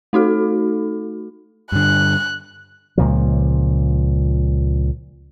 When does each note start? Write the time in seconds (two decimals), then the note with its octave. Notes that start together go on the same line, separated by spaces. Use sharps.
0.13 A3 D#4 F#4 A4
1.72 G2 D3 F#6
2.98 C#2 A#2 F3